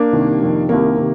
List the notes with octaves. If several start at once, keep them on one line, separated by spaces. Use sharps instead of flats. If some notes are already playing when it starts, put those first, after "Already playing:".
Already playing: A#3 D4
C2 C3 D#3
F2 C3 D#3
C2 C3 D#3 A#3
C3 D#3